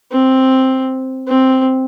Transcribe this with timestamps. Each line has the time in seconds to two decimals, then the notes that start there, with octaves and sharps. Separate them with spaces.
0.12 C4
1.28 C4